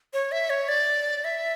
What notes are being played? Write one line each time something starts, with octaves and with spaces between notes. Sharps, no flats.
C#5
E5
C#5
D5
E5